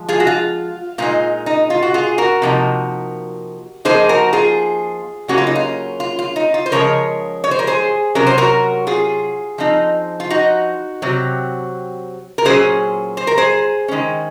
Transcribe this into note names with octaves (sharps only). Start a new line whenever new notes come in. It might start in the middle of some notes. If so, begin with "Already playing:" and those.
Already playing: F3 G#3
F4 G#4
F#4
F4
A#2 G#3 D#4 F4
D#4
F4
F#4
F4 G#4
F#4 A#4
C3 F3 A#3 D#4
F3 A#3 D#4 G#4 C5
F#4 A#4
F4 G#4
C#3 F#3 A#3 C#4 F#4
F4
D#4
F4
F4
F4
D#4
F4
C5
C#3 F3 G#3 A#4 C#5
C#5
C5
A#4
G#4 C5
C3 F#3 C#4 A#4
C5
F#4 A#4
F4 G#4
F3 C4 D#4
F4
D#4 F#4
C3 F#3 C4
A#4
A#2 F#3 C#4 G#4 C5
C5
A#4
G#4 C5
D#3 G#3 C#4